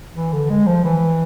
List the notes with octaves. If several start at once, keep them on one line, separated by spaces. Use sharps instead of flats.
E3
D3
G#3
F3
E3